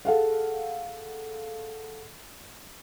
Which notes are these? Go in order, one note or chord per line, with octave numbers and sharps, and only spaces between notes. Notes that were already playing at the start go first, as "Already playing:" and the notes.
G#4 A4 F5 F#5